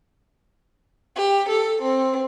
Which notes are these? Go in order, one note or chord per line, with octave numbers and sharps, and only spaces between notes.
G4
A4
C4